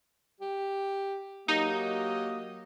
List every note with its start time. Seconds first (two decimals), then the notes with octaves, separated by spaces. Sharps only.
0.40 G4
1.48 F#3 A#3 D#4 G4 D#5